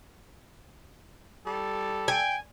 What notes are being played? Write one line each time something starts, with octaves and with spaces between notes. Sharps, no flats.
G3 A4
G5 G#5